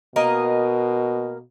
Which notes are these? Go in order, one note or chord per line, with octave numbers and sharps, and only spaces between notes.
B2 A#3 A#4 D#5